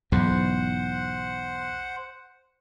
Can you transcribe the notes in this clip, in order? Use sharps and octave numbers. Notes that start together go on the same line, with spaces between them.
B1 E2 G#2 C5 F#5